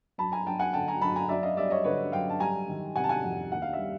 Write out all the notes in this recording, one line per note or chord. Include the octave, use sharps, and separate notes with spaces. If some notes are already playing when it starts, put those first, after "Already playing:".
F#2 A5 B5
G#5 A#5
F#3 G5 A5
F#5 G#5
D3 G5 A5
G#5 A#5
F#2 A5 B5
G#5 A#5
F#2 D5 E5
D#5 F5
G3 D5 E5
C#5 D#5
D3 B4 C#5
F#2 F5 G5
A5
G3 G#5 A#5
D#3
C3 F#5 G#5
A5
F#5 G#5
F2
D#2 F#5
F5
E5
G3